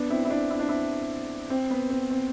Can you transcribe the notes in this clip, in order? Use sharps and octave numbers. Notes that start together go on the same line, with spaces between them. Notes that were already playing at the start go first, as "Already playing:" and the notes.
Already playing: B3 D4
C4 E4
E4
B3 D4
E4
D4
C4 E4
C4
B3
C4
C4